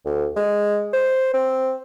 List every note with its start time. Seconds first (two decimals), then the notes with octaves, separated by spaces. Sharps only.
0.05 D2
0.36 G#3
0.93 C5
1.34 C4